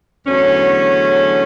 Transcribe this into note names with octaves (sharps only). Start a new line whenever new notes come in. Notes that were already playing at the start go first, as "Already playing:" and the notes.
E2 D3 F#3 A3 C#4